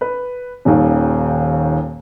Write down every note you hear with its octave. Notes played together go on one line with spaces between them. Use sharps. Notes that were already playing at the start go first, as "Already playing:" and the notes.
B4
D#1 D#2